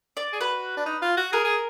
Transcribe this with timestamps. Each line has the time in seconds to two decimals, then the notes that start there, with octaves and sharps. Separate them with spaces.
0.17 D5
0.33 G#4
0.40 F#4 B4
0.77 D4
0.86 D#4
1.02 F4
1.17 F#4
1.32 G#4 A#4
1.44 G#4